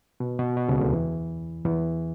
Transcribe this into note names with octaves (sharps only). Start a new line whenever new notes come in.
B2
B2
B2
C#2 C#3
D2 D3
E2 E3
E2 E3